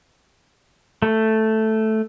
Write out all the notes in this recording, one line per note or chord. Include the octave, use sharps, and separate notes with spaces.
A3